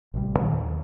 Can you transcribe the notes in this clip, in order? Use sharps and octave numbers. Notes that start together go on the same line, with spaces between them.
A1 C3 D#3 G3
A#2 D#3 F#3
D#2